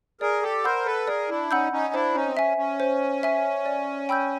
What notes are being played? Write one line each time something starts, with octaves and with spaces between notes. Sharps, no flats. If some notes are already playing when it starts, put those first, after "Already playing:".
G#4 A#4 D5
G4 A4
A#4 C5 F#5 B5 E6 G6
A4 B4
G#4 A#4 D5
D4 E4
C#4 D#4 F#5 B5 E6 G6
C#4 D#4
D4 E4 C5
C#4 D#4
C4
C#4 E5 G#5
C#4
C5
E5 G#5
D5
G5 B5 E6 G6